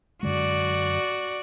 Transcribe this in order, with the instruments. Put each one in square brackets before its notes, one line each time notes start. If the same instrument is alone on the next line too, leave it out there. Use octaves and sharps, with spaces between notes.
[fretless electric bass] F#2 D3 G#3 [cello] F#4 D5